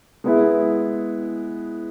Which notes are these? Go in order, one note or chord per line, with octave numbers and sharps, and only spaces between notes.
G#3 B3 E4 G#4